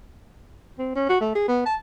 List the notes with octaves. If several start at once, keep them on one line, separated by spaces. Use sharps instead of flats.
C4
C#4
F#4
A3
G#4
B3
A5